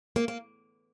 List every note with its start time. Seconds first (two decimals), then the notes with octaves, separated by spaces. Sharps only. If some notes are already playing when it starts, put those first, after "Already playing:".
0.16 A#3
0.28 A#3